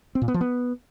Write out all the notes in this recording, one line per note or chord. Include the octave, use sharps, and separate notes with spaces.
C4
A#2
B3
F3
B3